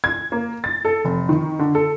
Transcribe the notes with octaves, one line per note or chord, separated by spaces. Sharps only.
G#6
A#3
A6
A4
F1
D#3
D3
A4